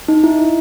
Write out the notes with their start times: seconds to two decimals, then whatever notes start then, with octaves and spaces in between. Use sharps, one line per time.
0.08 D#4
0.24 E4